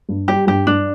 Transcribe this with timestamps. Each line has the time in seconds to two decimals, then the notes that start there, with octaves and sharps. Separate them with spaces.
0.09 G2
0.28 G3 G4
0.47 G2 G4
0.67 G2 D4